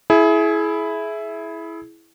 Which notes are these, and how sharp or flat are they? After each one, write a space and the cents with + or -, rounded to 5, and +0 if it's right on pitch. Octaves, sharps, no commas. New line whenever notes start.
E4 +0 G#4 +30